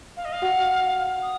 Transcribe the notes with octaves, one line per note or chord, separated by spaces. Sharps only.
F5
D#5
F5
F#4 F#5
D#6